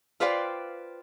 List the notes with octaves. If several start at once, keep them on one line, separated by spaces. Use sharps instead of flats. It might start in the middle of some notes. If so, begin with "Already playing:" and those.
F4 B4 C5 D5 F5 G5